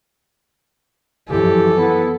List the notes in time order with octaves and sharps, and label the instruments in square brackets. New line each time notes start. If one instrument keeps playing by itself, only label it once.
[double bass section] F#2 E3 F3 [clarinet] G4 [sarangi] A4
[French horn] B3 [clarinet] E4